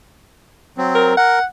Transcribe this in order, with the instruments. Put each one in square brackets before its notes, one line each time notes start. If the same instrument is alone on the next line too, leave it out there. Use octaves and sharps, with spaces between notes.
[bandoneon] F#3 C4
[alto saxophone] A#4
[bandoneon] A#4 [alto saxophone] F#5